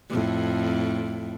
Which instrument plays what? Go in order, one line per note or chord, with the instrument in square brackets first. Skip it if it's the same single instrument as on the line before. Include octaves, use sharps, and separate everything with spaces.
[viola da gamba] F2 A2